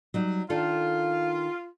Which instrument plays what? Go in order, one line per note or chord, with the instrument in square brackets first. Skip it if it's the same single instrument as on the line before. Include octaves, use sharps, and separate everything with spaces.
[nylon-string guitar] F#3 G3 D#4
[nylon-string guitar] D#3 D4 A4 [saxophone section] F4